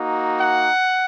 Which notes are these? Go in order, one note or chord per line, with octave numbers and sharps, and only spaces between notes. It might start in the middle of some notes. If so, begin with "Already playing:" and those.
Already playing: A#3 D#4 F#4
F#5